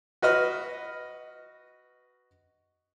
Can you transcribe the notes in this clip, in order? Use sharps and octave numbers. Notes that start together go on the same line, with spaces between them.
F#4 B4 D#5 F6